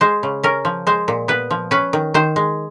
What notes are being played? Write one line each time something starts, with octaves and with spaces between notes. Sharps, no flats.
G#3 C5
C#3
C#4 A#4
F3
G#3 C5
A#2
B3 B4
F3
C#4 B4
D#3
D#3 C5
G#3